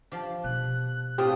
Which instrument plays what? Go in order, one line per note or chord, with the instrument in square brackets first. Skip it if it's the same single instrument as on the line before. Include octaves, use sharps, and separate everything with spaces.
[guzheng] F3 G4
[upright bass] B2 D#3 [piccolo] F#6
[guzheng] A2 C4 F4 [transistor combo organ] G4 [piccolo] D#6